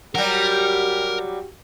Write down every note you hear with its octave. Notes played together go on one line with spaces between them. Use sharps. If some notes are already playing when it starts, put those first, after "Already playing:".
F#3 G3 F#4 G4 A#4